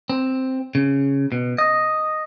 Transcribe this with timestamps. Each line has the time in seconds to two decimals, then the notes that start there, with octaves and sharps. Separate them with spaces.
0.10 C4
0.75 C#3
1.32 B2
1.58 D#5